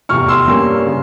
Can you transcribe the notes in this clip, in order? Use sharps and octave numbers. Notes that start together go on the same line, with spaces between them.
F1 E2 C3 C#6 F6
C6 E6
G2 G3 A#3 C#4
C#3